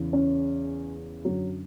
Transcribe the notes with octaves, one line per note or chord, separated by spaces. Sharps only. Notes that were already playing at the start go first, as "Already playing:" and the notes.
Already playing: E2 C#3 E3
C#4
F#2 D3 F#3